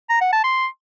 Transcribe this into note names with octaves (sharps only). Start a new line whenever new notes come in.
A#5
F#5
A5
C6